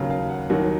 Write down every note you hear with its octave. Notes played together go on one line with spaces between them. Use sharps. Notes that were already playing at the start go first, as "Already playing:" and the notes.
Already playing: D#2 C#3 F#3 F5
F5
F#5
D#2 D#3 F#3 F#5